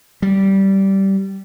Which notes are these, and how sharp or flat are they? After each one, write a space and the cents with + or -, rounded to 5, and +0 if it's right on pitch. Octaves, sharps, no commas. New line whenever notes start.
G3 -15